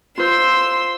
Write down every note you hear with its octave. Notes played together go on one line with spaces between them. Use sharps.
F4 C5 C6 E6